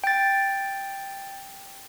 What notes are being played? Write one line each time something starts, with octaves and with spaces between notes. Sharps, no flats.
G5 A6